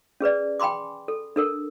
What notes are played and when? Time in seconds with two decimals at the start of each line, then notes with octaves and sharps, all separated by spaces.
0.20 C#4 G#4 B4 D5
0.60 G5 G#5 B5 C6 D6
1.08 A4
1.36 D4 A4 A#4